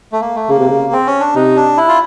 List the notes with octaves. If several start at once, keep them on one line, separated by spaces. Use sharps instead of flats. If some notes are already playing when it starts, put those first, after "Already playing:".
A3
A#3
A3
C#3 A#3
C3
C#3
C4
C#4
D4
C3 D#4
D4
E4
F4